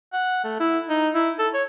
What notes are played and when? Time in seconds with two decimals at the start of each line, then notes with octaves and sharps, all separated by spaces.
0.13 F#5
0.44 A3
0.60 E4
0.89 D#4
1.14 E4
1.39 A4
1.54 C#5